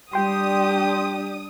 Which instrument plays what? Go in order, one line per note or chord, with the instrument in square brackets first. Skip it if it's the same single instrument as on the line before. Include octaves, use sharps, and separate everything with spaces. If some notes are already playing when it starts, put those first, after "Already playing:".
[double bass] G3 [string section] D4 D#6 [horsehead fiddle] G4 [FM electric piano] G5 C6